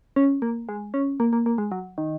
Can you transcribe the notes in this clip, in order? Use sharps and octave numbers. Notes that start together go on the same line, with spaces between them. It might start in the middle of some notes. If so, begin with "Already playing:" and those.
C#4
A#3
G#3
C#4
A#3
A#3
A#3
G#3
F#3
D#3